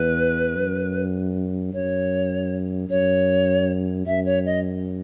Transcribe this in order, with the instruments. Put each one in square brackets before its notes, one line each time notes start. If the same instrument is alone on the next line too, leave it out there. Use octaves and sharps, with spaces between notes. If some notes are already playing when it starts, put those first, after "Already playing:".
Already playing: [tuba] E2 [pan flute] B4
[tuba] F#2
[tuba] F#2 [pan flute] C#5
[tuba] F#2 [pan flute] C#5
[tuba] F#2 [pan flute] E5
[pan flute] C#5
D#5